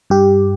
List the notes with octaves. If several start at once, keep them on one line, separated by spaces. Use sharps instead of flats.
G2 G4